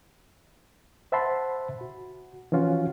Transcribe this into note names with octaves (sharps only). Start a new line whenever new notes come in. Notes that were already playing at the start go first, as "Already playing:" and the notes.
C5 E5 F#5 A5 B5 C6
F#4
E3 F3 C#4 F4 F#4